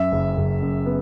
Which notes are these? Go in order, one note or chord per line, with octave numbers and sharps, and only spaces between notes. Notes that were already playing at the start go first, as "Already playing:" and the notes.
Already playing: F#2 E5
F#1
F#1
F#2
B3